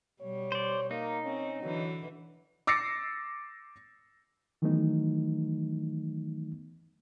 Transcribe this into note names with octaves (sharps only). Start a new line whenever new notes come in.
B2 G3 C#5
C5 D5
A#3 D#4
C4 C#4
D3 E3 F#3
D6 E6 A6 A#6 C7 C#7
D#3 E3 F#3 A3 B3 D#4